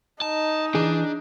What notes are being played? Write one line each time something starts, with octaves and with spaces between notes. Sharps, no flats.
D#4 A5
E3 D4 G#4